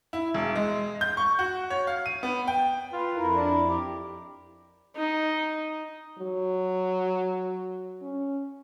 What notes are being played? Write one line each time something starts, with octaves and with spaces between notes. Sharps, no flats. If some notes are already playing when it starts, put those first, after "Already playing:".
E4
E1
G#3
G6
C#6
F#4
C#5
F5
D#7
B3
G5
F4 B4
F2 E4 A#4
D4
G4
D#4
F#3
C#4